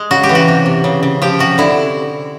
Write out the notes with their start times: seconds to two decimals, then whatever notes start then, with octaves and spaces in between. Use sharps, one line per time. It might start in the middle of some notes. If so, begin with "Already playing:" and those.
Already playing: G#3
0.11 C#3 F#4
0.23 G4
0.29 E3
0.35 F#4
0.48 C3
0.66 C3
0.84 C#3
1.03 C#3
1.22 F3 G4
1.39 C3 F#4
1.58 D3 E4